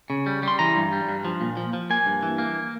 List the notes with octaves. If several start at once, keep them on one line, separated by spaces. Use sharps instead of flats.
C#3
G3
G3 C6
E3 A#5
G2
G3
G2
F3
A#2
F3
F3
A#3 G#5
G2
E3
A#3